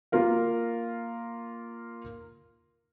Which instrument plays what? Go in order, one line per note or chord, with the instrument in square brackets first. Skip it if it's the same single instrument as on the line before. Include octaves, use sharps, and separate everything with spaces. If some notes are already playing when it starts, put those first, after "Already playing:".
[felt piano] A#3 F4 A#4 F5